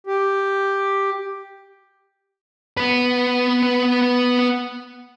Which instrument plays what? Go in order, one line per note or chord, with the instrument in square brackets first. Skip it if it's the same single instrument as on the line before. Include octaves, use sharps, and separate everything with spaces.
[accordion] G4
[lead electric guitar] B3 B4